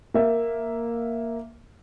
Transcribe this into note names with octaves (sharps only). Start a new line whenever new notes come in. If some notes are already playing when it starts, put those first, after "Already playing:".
A#3 E5